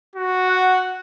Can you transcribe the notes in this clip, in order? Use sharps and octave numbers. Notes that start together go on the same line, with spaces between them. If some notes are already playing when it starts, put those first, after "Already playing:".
F#4
F#5